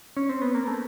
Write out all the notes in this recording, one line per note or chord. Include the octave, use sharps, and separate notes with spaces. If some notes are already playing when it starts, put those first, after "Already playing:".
C#4
C4
B3
A#3
A3